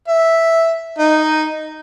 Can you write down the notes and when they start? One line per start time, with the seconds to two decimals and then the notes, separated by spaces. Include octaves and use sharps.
0.08 E5
0.98 D#4